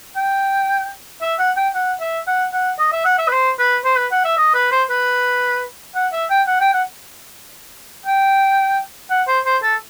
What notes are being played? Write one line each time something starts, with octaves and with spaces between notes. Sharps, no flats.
G5
E5
F#5
G5
F#5
E5
F#5
F#5
D#5
E5
F#5
E5
B4
C5
B4
C5
B4
F#5
E5
D#5
B4
C5
B4
F#5
E5
G5
F#5
G5
F#5
G5
F#5
C5
C5
A4